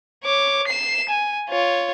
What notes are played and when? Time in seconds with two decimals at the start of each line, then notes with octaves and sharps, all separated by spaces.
0.24 C#5 D6
0.67 C7 E7
1.09 G#5
1.49 F4 C#5